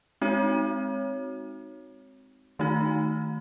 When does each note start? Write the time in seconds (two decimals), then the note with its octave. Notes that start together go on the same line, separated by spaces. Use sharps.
0.21 G#3 C4 D#4 F#4 C#5
2.59 D#3 A3 D#4 F#4